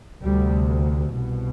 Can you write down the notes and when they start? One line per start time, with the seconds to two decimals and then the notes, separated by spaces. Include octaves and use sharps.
0.21 D2 C3 G3
1.13 C2 B2